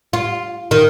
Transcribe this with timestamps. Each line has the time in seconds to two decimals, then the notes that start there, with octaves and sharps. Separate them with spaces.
0.13 F4
0.71 D#3